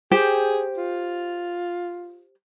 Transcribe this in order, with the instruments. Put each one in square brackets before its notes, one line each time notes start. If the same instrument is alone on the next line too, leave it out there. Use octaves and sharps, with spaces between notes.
[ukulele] G4 C5 G5 [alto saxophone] G#4
[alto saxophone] F4